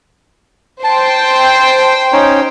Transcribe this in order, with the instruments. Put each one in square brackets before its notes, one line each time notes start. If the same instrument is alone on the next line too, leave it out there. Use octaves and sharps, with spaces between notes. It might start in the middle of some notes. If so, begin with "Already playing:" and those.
[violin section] C5 G5 [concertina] A5
[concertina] C#4 D#4 C#5